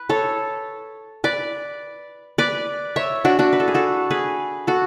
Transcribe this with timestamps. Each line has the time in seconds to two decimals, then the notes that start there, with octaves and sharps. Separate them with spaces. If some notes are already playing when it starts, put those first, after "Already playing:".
Already playing: B4
0.09 A4 C#5
1.24 B4 D5
2.38 B4 D5
2.96 C#5 E5
3.25 D4 F#4
3.39 D4 F#4
3.53 B4
3.60 A4
3.68 G#4
3.74 F#4 A4
4.10 G#4 B4
4.67 F#4 A4